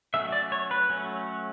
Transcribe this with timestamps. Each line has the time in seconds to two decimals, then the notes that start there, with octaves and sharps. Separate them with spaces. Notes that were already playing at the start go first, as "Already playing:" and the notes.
0.14 F#3 A3 C#4 E5
0.32 D5
0.52 C#5
0.71 B4
0.90 F#3 A3 C#4